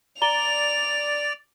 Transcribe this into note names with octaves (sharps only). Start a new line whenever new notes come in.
D5 A#5 F7 G7